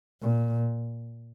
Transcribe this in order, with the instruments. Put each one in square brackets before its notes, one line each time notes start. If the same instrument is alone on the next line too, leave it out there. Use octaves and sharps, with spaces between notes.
[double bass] A#2